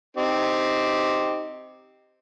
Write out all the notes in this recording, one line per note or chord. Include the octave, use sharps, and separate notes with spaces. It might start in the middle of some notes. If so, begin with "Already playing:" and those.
C4 D#4 G4